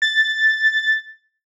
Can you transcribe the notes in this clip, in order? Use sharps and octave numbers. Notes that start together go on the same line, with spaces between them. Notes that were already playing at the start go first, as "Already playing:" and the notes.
A6